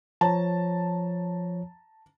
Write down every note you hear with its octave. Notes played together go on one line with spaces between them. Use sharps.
F3 C#5 A5 A#5